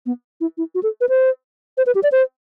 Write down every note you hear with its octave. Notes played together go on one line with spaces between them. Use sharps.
B3
E4
E4
F#4
A4
B4
C5
C5
B4
G4
D5
C5